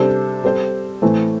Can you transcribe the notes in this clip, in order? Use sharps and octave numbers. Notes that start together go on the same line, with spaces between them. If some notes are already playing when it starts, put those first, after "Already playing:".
Already playing: C3 G3 D4 A4 C5
G3 C4 A4 C5
A2 E3 A3 C4